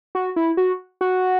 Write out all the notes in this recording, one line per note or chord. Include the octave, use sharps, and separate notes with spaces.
F#4
E4
F#4
F#4